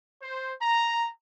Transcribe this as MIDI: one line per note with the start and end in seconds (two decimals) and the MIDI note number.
0.22 0.53 72
0.62 1.08 82